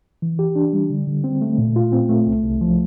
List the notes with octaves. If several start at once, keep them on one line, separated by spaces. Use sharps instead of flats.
E3
G4
D4
G3
D3
D3
C4
A3
A#2
F4
C4
A3
C2
C2
F3